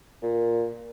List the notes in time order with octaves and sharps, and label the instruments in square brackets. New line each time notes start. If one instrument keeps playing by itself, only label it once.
[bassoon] A#2